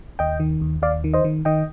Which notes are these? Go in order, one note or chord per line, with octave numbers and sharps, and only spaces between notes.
D#2 D#5 G5
D#3
D#2
D#2 D5 F5
D#3
C5 D#5
D#3
D#3 D#5 G5